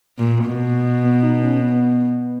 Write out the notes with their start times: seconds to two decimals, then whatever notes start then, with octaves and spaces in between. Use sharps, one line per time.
0.18 A#2
0.46 B2
1.04 B3
1.23 D#4
1.43 C#4
1.61 B3